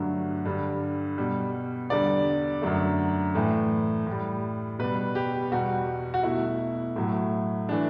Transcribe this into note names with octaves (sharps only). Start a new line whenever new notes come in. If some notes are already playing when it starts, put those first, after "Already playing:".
Already playing: G2 D3 F#3 A3
G2 D3 G3
B2 G3
E2 D3 G3 D5
F#2 D3 F#3 A3
A2 E3 A3
A2 G3
B2 G3 B4
G4
E2 B2 G3 F#4
F#4
B2 A3 E4
A2 F#3 A3
E3 A3 D4